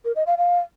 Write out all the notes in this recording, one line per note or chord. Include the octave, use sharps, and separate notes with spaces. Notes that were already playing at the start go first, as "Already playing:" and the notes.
A#4
D#5
F5
F5